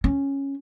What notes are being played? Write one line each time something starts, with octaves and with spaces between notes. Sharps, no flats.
C#4